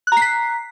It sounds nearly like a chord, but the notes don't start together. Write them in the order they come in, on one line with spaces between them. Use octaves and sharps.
F#6 A#5 C7 B6